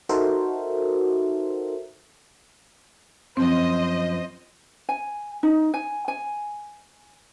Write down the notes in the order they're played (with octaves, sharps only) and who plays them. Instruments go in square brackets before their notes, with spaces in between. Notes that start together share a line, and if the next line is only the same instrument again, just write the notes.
[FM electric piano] D#4 F#4 A4 A#4 C5 E5
[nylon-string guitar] F#2 F3 [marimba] C4 [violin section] C5 D#5
[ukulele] G#5
D#4
G#5
G#5